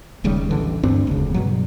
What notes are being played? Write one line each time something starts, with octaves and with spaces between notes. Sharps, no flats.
E1 D#2 C#3 G3
A1 D3 E3
D2 G2 C4 D4
E1 D2 C#3
G2 B2 F#3